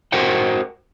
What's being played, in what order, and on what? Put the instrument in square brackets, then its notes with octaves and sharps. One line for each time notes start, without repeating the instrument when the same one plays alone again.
[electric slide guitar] F#4 A#4 C5 F#5 G5